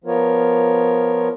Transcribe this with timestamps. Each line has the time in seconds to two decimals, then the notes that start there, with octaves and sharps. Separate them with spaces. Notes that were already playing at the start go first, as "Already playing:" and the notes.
0.04 F3 B3 F4 A#4 C#5